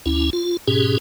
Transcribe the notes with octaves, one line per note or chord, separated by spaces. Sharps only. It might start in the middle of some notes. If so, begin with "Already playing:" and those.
D2 C#4 E4
F4
G#2 B2 C#4 G4 G#4